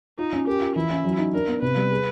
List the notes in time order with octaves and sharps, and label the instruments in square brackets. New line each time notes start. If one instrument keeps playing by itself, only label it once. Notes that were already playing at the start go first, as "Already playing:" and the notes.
[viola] D#4 [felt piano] F4
[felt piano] C#4
[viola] G4 [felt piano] A#4
[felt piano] F4
[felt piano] E3 [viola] E4
[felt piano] C#4
F#3
D#4
[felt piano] D4 [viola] A#4
[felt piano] B3
[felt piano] C3 [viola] B4
[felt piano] G3
G#4